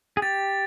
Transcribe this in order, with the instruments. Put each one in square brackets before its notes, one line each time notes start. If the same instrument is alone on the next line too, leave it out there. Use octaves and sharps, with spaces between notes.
[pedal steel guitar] G#4
[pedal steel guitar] G4 [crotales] A6